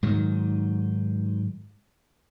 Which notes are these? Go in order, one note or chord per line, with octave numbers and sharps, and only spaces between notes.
G#2 D#3 F#3